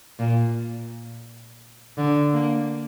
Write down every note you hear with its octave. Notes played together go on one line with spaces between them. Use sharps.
A#2
D3
A#3